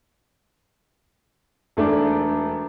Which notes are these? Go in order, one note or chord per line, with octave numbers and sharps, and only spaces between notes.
E1 A3 D4 D6